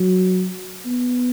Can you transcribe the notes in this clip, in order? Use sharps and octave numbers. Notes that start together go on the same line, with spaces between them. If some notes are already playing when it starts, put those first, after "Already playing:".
Already playing: F#3
B3